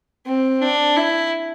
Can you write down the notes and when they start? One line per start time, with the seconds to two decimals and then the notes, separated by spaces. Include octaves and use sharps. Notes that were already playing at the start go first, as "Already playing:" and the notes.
0.26 C4
0.61 D4
0.97 E4